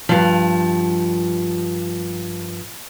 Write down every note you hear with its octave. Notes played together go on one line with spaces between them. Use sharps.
G2 F3